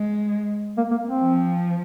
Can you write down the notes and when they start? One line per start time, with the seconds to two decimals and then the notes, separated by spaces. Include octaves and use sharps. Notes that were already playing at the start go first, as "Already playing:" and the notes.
Already playing: G#3
0.77 A#3
0.91 A#3
1.05 C4
1.19 F3